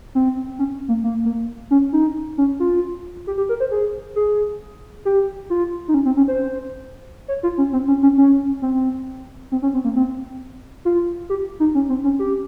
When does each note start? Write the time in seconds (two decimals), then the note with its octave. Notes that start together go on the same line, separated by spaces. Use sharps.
0.15 C4
0.59 C#4
0.88 A#3
1.04 A#3
1.25 A#3
1.71 C#4
1.93 D#4
2.38 C#4
2.60 F4
3.27 G4
3.38 G4
3.49 A#4
3.60 C5
3.71 G#4
4.16 G#4
5.05 G4
5.50 F4
5.88 D#4
5.94 C#4
6.05 C4
6.17 C#4
6.28 C5
7.28 C#5
7.43 F4
7.58 C#4
7.73 C4
7.88 C#4
8.03 C#4
8.18 C#4
8.62 C4
9.52 C4
9.62 C#4
9.74 C4
9.84 A#3
9.96 C4
10.85 F4
11.30 G4
11.60 D#4
11.75 C#4
11.89 C4
12.04 C#4
12.19 G4